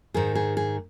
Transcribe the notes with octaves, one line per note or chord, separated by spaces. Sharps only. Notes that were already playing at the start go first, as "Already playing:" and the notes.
G#2 D#3 G#4
G#4
G#4